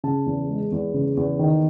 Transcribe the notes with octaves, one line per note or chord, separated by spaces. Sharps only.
C#3 A5
E2
G#3
E2
C#3
E2
D#3